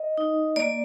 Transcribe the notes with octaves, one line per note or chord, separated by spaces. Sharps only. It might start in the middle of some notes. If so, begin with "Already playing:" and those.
Already playing: D#5
D#4
A#3 D5